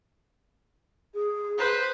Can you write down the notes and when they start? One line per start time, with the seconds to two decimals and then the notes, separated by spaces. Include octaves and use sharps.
1.14 G#4
1.58 B4 C5